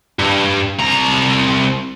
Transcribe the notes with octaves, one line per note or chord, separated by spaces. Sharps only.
G2
C2 A#5